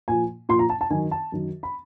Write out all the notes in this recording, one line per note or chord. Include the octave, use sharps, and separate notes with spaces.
A#2 F3 G#5
A#2 F3 C6
A#5
A5
A5
F#2 D#3 G#5
A5
F#2 D#3
B5